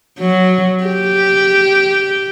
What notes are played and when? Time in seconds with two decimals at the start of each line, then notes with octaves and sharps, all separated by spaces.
0.19 F#3
0.84 G4